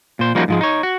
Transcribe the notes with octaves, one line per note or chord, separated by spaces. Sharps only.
A#2 C5
F3 G3 A#3 C#4 D#4 F#4
G#2 F3 G#3
D#4 C#5
F#4